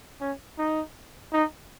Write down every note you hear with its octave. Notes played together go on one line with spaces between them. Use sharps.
C#4
D#4
D#4